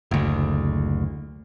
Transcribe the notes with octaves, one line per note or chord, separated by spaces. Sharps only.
F#1 D2